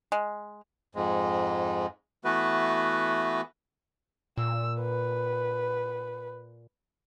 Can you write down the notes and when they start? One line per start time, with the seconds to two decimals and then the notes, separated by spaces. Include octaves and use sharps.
0.12 G#3
0.95 F2 G#2 G#3
2.24 E3 A3 B3 F#4 B4
4.37 A#2 E6
4.81 B4